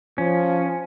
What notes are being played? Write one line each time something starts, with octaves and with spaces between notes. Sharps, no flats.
F3 C#4